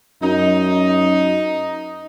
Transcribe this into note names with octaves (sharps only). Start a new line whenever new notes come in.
F#2 D#4